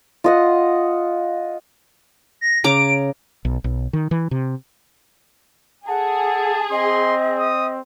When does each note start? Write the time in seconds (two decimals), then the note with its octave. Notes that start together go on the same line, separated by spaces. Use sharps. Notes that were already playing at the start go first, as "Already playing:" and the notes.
0.24 F4 D#5 F#5
2.41 A#6
2.64 C#3 A#5 D6 D7
3.45 B1
3.64 B1
3.93 D#3
4.11 E3
4.31 C3
5.88 G#4 A4 F#5 A5
6.71 C4 D#5 C6
7.39 D#6